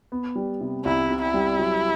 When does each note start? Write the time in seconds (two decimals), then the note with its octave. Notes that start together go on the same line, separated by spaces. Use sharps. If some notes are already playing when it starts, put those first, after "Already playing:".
0.12 B3
0.36 G3
0.61 C3
0.85 C2 E4
1.10 C3
1.22 E4
1.34 G3
1.59 F#3